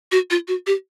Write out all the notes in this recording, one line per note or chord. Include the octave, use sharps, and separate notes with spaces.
F#4
F4
F#4
G4